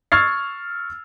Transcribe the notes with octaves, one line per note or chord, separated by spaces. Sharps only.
C#6 E6 F6 G#6 A6 C7